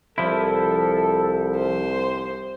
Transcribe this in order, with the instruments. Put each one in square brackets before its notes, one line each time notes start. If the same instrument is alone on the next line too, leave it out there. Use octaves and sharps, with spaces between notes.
[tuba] C2 [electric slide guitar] F3 E4 [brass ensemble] A4
[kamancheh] C5